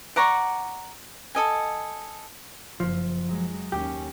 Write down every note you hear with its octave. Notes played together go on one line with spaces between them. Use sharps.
D5 F#5 A#5 C#6
A4 D#5 G#5
F#1 F3
F#3 G#3
D#2 C#4 G4